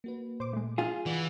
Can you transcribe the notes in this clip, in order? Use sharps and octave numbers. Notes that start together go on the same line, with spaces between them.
A#3 F#4 B4
A#2 C5 D6
G#3 A3
F4 G#4 F5
E3 D5 F#5